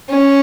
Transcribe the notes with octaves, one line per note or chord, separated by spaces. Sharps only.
C#4